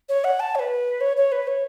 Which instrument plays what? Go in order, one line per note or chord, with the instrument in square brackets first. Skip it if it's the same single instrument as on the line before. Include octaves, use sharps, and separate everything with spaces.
[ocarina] C#5
F#5
A5
C#5
B4
C#5
C#5
B4
C#5